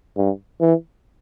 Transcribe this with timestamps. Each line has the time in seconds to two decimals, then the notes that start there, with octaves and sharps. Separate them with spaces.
0.17 G2
0.61 E3